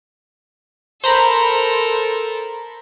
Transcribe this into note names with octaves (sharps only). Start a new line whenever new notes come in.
A4 A#4 C5 A#5 B5